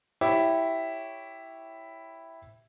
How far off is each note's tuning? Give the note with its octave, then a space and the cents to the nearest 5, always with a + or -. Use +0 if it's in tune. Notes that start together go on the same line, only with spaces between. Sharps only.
E4 +0 G4 -5 C#5 +0